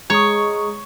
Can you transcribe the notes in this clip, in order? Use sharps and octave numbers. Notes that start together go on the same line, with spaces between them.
G#3 C#5 A#5 C#6 D#6